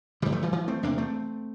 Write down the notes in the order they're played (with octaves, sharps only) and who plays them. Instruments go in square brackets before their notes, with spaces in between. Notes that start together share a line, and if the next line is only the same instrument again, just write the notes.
[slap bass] G2 D3 E3 G3
F3 A3
E3 G3
E3
A3 C4
E2 C3 A#3 D4
A3 C4